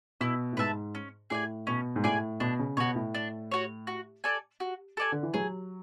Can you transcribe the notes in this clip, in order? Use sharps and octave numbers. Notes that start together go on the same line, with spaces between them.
B2 E4
A2
G#2 B4 E5 A5
C#4
A2 G#4 D5 G#5
B2 C#4
G#2
A2 G#4 D5 G#5
B2 D4
C#3
B2 F#4 C#5
A2
D4
F#4 C#5
F#4
A4 D5 G#5
F#4
A4 D5 G#5
D3
E3
F#3 G#4